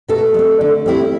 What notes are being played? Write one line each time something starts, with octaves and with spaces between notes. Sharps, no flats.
B2 A3 A4
G3
C4
D3
G3 C4 E4